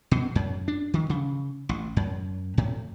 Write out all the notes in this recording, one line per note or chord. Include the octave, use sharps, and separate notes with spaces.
B2
F#2
D4
D#3
C#3
A1
F#2
A2